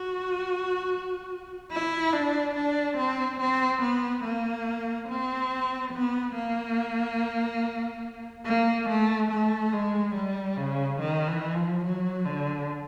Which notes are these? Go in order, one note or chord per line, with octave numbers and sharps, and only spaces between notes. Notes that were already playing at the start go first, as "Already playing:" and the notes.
Already playing: F#4
E4
D4
D4
C4
C4
B3
A#3
C4
B3
A#3
A#3
A3
A3
G#3
G3
C#3
D#3
E3
F3
F#3
D3